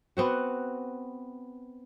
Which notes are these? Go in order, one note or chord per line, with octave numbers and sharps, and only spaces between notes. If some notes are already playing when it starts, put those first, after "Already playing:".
B3 C4 F#4